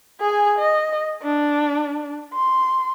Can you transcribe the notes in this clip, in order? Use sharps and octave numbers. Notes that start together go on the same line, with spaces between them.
G#4 G#5
D#5
D4
C6